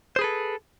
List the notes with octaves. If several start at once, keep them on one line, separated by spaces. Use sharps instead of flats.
G#4 A4 B4 C5